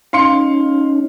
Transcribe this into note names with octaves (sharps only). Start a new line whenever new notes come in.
C#4 D#4 F5 C6 C#7